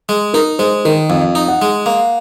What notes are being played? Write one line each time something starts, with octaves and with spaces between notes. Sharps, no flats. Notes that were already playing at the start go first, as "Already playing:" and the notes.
G#3
D#4 A#4
G#3 C5
D#3 A#4
F2
D#4
F#5
G#3
A#3